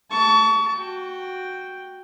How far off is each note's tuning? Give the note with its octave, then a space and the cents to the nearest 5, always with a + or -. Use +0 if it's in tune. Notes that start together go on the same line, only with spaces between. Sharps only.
A5 +0 C#6 +35
F#4 +0 G5 +0